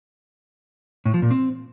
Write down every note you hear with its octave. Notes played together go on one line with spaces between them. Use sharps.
A2
F3
A#2
C4